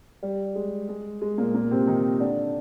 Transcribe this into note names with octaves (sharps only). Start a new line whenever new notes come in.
G3
G#3
G#3
G#3
A#2 A#3
A#2 A#3
C3 C4
D#3 D#4
D3 D4